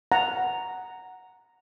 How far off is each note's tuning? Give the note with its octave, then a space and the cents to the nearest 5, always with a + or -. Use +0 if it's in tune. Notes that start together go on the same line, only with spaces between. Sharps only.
F#5 +0 A#5 +0